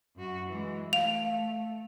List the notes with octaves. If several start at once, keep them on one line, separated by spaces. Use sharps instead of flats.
F#2 F#4
E3 G#3
A3 F5 F7